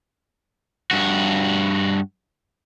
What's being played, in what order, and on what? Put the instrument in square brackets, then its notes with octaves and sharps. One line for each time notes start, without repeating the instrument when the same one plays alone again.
[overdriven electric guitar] G2 F#4